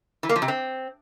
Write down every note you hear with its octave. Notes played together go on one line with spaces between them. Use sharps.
E3
A#3
F3
C3
C4